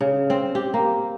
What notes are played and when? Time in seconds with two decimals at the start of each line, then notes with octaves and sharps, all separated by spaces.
0.01 C#3
0.30 C4
0.55 G4
0.74 A#3